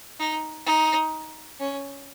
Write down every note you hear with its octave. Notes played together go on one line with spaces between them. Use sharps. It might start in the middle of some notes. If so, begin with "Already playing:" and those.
D#4
D#4
C#4